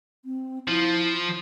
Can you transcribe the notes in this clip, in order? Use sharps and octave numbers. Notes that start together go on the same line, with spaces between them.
C4
F3 E4